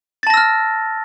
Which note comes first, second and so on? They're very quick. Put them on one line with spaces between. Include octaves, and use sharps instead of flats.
A6 A5 A#6 E6 F6